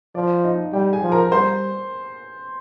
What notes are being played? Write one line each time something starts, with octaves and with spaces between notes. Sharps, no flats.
F3 D5
D#4 D#5
G3 G4 G5
G#4 G#5
F3
A#4 A#5
G3 C5 C6